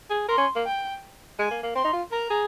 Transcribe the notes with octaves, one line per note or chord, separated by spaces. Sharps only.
G#4
A#4 C6
C#4
A#3
G5
G#3 G#5
A#3
A#3
C4 C6
D#4
F4
A#4 A#5
G#4